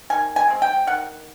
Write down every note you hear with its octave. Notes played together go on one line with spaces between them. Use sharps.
D#3 G#5
G#5
G#3 C4
G5
D#3 F#5